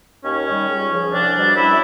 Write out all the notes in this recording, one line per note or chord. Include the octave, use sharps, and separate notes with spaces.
D#2 C#4
D#3 G3
C#2
C#3 F3
C2 D4
B2 G3
F#2 E4